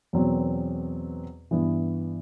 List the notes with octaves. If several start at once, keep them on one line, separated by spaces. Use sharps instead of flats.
E2 B2 F#3 C4
G2 E3 B3 E4